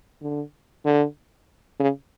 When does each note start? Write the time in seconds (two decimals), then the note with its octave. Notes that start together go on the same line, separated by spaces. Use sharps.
0.22 D3
0.85 D3
1.80 C#3